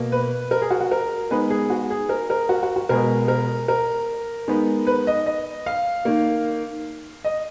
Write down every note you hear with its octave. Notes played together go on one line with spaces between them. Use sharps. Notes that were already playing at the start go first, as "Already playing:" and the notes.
Already playing: B2 A#3
B4
A#4
G#4
F#4
F#4
A#4
D#3 G#3 B3 B4
G#4
F#4
G#4
A#4
A#4
F#4
F#4
F#4
B2 G#3 B3 A#4
A#4
A#4
D#3 G#3 B3
B4
D#5
D#5
F5
D#3 A#3
D#5